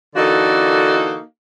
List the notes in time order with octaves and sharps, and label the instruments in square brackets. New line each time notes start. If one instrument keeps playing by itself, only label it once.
[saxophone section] D3 E3 A#3 D#4 F#4 A4